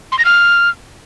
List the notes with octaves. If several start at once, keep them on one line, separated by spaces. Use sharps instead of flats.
C6
A#6
F6